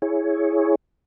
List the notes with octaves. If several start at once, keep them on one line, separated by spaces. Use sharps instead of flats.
E4 G#4 C#5